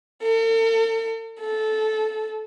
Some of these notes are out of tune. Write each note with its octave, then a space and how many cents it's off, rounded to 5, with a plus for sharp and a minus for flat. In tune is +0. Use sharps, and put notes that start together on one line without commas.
A4 +45
A4 -15